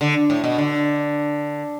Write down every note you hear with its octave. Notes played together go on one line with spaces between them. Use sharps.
D3
A2
B2
D3